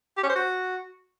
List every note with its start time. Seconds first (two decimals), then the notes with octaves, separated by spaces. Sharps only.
0.17 G4
0.23 C#4
0.29 C5
0.35 F#4